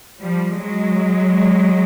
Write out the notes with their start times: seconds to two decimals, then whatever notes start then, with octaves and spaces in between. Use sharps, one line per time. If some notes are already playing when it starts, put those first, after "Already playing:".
0.22 F3 G3
0.63 F#3 G#3